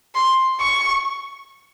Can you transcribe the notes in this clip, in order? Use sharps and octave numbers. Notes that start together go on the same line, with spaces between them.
C6
C#6